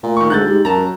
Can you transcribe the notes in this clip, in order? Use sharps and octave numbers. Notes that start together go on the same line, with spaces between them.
A#2 A3
D#3 C#6
D2 G#3 F#6 G6 A6
G#2 G4
F#2 A#4 A5 A#5
F#3